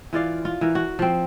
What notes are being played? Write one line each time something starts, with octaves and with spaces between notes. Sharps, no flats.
E3 F4 D5 F5
F4
E3 A#4
F#4
F3 C4